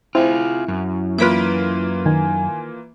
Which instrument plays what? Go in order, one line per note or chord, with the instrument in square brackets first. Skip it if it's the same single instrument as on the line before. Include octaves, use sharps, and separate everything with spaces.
[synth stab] C4 [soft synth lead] E4 [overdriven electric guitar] F4 G#4
[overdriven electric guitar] F#2
[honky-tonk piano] E3 A#3 F4 [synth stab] B4 B6 D7
[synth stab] D#3 [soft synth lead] G#5